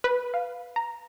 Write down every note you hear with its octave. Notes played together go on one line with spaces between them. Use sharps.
B4
F5
A#5